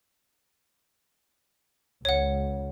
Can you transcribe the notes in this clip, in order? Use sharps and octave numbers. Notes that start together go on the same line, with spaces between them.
C#2 C#5 F#5